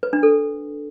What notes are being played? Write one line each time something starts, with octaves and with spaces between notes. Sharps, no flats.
B4
D4
A4